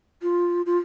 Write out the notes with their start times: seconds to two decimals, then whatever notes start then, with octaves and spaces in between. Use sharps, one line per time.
0.22 F4
0.66 F4